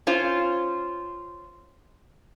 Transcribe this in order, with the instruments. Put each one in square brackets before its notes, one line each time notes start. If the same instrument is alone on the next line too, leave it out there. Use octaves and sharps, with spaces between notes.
[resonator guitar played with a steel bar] C#4 F4 C5